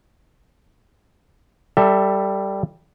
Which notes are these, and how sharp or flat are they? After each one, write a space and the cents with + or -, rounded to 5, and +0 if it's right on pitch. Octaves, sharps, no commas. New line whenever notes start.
G3 +0 A4 +20 E5 +0